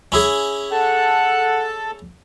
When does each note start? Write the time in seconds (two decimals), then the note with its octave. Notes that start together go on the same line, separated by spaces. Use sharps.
0.12 C#4 E4 G#4
0.72 A4 F#5 A5